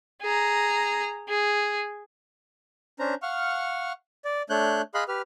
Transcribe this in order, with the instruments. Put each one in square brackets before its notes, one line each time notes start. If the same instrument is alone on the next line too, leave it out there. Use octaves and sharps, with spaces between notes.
[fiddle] G#4 A#5
G#4
[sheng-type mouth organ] C#4 D4 C5 A#5
F5 F#5 C#6 F6
D5
A3 D4 C#5 F#6 G6
G#4 D#5 F5 B5 C6 F#6
G4 B4 F6